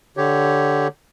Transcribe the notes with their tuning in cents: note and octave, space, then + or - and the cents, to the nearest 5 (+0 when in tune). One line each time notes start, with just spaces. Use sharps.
D3 +0 G4 +0 C#5 +0